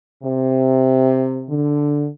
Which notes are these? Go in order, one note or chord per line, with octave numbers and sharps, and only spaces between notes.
C3
D3